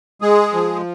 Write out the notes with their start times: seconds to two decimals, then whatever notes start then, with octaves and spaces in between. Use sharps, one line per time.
0.22 G#3 G#4
0.53 F3